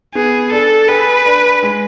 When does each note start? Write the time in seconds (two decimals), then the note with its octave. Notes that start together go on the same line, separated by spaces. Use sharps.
0.15 B3 G#4
0.51 D4 A4
0.88 G#4 B4
1.25 D4
1.63 G#3